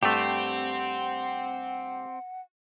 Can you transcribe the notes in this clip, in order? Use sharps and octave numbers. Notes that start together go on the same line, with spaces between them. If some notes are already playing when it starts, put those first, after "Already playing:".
G2 A3 C4 G4 F#5